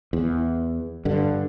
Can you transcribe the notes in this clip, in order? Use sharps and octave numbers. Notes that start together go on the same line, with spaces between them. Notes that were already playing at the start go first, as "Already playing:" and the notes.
E2
G2 D3